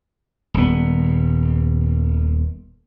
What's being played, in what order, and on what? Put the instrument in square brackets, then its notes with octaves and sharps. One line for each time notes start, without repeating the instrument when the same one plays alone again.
[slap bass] D#1 B3